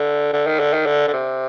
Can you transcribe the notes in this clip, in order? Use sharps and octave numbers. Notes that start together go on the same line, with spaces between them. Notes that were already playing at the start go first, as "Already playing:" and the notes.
Already playing: D3
D3
D#3
D3
D#3
D3
D3
C3